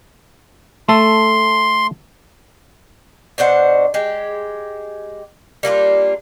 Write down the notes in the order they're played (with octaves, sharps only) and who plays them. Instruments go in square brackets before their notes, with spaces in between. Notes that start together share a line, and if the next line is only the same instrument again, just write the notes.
[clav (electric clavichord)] A3 A4 [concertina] C6
[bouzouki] B2 D4 C5 F#5
G#3 G4
G3 A#3 D4 F4